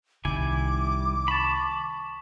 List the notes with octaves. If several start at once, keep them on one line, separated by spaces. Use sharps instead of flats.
C2 D#3 G3 E4 G#5 D6
A5 B5 C#6 A6